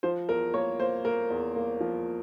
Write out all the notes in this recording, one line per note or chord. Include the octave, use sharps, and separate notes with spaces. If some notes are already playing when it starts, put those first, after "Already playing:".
F3 C5
E2 A#4
A#3 C#5
A#3 C5
A#3 A#4
E2
A#3
F3